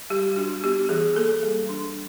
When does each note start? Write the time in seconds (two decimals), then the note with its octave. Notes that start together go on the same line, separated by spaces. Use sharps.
0.10 G3 G4
0.36 D4 F#4
0.63 B3 G4
0.89 E3 G#4
1.15 A#3 A4
1.43 G3
1.69 D4